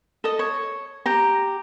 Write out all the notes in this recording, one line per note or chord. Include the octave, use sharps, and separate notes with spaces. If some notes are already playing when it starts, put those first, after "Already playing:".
A4 D#5
C#5
G4 A#5